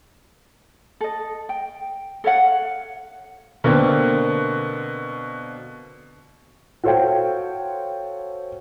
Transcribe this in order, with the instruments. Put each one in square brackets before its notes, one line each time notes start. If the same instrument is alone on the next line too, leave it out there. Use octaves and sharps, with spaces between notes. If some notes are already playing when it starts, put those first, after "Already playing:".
[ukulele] A4 D#5
G5
A4 C#5 F5 F#5
[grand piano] B2 D3 A#3 C4
[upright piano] F#4 A4 C5 C#5 F5 G5